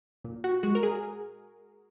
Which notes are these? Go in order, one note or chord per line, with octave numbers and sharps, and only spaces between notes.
A#2
F#4
G#3 F#4
A#4
G#4